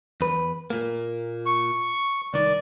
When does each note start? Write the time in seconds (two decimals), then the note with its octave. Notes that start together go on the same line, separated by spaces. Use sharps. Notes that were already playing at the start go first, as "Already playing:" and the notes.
0.21 E2 B4
0.70 A#2 A#3
1.46 C#6
2.34 C2 D#3 D5